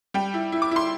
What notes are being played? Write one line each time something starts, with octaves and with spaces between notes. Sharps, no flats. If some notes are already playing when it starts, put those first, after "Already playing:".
G3 G5
E4
E4
D6
E4 C6